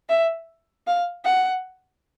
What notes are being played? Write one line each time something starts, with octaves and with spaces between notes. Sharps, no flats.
E5
F5
F#5